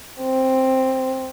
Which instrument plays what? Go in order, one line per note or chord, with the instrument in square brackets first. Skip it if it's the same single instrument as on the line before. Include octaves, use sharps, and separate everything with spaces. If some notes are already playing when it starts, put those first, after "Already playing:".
[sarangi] C4